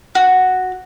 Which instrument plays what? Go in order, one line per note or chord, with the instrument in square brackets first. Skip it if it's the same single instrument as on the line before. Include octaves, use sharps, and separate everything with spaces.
[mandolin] F#4